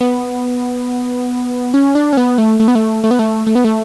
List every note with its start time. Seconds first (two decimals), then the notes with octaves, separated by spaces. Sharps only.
0.01 B3
1.74 C#4
1.95 D4
2.13 C#4
2.17 B3
2.38 A3
2.60 A3
2.68 B3
2.75 A3
3.04 A3
3.11 B3
3.19 A3
3.47 A3
3.55 B3
3.64 A3